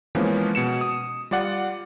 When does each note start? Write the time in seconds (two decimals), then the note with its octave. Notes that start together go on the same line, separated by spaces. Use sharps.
0.15 E3 F3 G#3 A#3 B3 C#4
0.55 B2 C#7 E7
0.81 D#6
1.31 G3 F4 D5 F#5